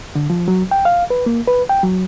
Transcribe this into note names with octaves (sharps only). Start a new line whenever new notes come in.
D3
F3
F#3
G5
F5
B4
A#3
B4
G5
F#3